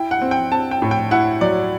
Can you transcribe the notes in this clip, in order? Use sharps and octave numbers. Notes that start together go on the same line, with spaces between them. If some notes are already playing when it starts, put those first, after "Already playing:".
Already playing: E4 G5
F#5
C4
G5
C4 A5
G5
A2
G5
E4 F#5
F#3 D5